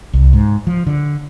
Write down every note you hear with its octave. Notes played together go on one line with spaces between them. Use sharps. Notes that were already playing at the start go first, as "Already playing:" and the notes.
C2
G#2
F3
D3